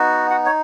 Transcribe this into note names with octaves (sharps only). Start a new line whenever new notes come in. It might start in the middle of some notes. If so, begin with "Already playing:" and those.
Already playing: B3 D#4 F#4
F#4 F#5
C#5